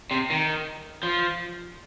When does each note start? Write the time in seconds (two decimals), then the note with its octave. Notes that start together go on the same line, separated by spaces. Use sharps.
0.11 C3
0.30 D#3
1.03 F3